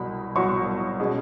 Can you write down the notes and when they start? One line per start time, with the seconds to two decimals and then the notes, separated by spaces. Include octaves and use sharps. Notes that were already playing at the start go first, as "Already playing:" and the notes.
Already playing: C2 B2 F#3 B5
0.35 C2 B2 F#3 C#6
1.00 B2 G#3 C#4